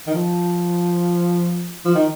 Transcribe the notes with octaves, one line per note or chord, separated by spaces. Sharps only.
D#3
F3
F3
D#3